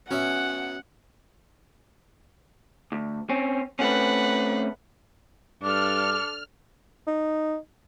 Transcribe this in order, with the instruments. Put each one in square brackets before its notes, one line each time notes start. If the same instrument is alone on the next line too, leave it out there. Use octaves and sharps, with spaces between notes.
[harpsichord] F#3 B3 E5 [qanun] C#4 [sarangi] F#5
[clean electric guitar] D2
C4 C#4
[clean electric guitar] A3 C4 C#4 [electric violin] B4 F#5
[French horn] G2 [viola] D4 A4 [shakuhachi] D6 [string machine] F6
[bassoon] D#4